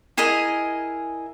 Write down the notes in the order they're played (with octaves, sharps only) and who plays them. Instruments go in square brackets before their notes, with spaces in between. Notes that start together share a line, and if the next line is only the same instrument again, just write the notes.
[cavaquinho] E4 G#4 A#4 D#5